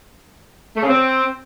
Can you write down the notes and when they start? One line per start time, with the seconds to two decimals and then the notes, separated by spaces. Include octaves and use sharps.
0.76 A3
0.82 C#3
0.88 C4